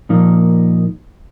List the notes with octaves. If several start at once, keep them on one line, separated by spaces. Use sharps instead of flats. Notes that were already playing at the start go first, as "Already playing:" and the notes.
A#2 F3 A#3 D#4